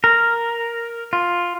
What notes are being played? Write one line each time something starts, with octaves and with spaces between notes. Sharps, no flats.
A#4
F4